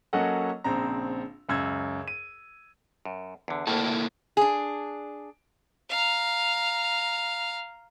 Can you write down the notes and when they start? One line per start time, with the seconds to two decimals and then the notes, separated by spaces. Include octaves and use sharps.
0.13 F#3 A#3 C#4 A4 D#5 F#5
0.64 A#1 C#3 C4 A#5
1.49 C#2 F#2 E6 G#6
2.08 D#7
3.05 F#2
3.48 E2 D3
3.67 D2 A2 A#3 E4 A4
4.37 D4 G#4
5.89 F5 A#5